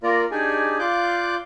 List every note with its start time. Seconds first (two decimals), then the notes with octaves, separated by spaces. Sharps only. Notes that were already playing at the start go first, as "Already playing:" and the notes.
0.03 A#3 F4 A#4 D5 A#5
0.31 D4 D#4 G4 G#4 D5 G#5
0.79 F4 D5 F5 D6 F#6 G6